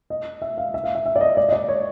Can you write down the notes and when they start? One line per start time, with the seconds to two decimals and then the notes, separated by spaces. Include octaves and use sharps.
0.10 D#5
0.42 E5
0.58 F5
0.74 E5
0.84 F5
0.95 E5
1.06 E5
1.16 D5
1.21 D#5
1.37 D5
1.49 D#5
1.53 D5
1.69 C#5